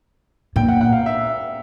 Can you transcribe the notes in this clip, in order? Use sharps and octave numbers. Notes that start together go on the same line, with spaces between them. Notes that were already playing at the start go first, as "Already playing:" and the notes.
A#2 G5
F#5
F#5
F5
E5